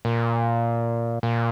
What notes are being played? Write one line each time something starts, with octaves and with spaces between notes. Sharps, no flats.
A#2
A#2